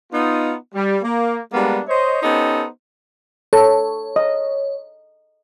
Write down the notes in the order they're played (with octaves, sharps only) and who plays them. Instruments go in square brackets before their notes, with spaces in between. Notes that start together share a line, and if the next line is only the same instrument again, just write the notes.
[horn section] B3 D#4 F4
G3
A#3
G3 G#3 A#3 B3 D4
C5 C#5 D#5
B3 C#4 D#4 G4 A4 C5
[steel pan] A4 [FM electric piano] C#5
[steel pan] D#5